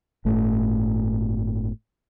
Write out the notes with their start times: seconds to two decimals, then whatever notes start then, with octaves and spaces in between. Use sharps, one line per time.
0.25 G1 A2 A3